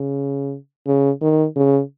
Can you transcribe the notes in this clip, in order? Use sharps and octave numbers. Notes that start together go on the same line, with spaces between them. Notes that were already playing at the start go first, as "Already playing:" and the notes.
Already playing: C#3
C#3
D#3
C#3